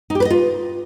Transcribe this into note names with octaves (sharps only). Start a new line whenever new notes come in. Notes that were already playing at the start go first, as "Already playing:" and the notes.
D#4
G4
B4
D#5
F4